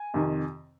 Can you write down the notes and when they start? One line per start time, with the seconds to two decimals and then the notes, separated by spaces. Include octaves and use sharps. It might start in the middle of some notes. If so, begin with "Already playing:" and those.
Already playing: G#5
0.14 F2 C3 D#3